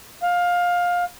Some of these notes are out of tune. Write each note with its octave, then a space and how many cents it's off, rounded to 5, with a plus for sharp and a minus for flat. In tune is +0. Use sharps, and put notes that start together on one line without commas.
F5 +20